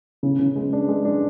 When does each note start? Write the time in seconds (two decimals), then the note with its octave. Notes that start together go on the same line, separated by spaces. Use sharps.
0.23 C#3
0.39 C#3
0.55 G#3
0.73 D4
0.88 G#3
1.05 D4